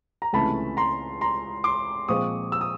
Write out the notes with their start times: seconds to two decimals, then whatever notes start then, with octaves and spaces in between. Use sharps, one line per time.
0.22 A#5
0.33 C#2 C3 E3 A3 C#4 A5 B5
0.77 A#5 C6
1.21 A#5 C6
1.64 C6 D6
2.08 A#2 F3 G#3 C4 C#6 D#6
2.52 E6
2.61 D#6